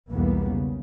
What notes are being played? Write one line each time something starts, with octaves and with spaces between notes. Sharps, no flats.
B1 E2 E3 G3 A#3 B3
C#3